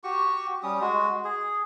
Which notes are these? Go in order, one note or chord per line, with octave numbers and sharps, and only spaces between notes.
F#4 G4 C#6
G3 C#4 D#6
G#3 F#4
G#4